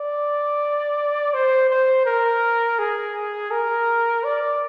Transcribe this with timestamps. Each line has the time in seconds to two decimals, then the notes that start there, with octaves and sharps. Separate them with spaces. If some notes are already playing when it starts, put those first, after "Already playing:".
Already playing: D5
1.33 C5
1.70 C5
2.05 A#4
2.79 G#4
3.51 A#4
4.24 D5